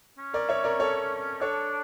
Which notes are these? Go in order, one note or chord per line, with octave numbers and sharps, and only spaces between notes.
C#4
A#4 D5
C#5 E5
A#4 D5
A4 C#5
D4 A4 C#5